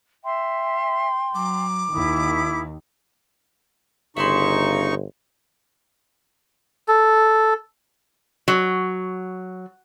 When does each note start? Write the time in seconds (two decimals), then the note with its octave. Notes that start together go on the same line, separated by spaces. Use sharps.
0.24 E5 G5 C6
1.35 F#3 A#5 D6
1.93 D#2 D#3 E4 D#6
4.17 G1 C#3 D#4 E4 E5 C6 C#6
6.88 A4
8.48 F#3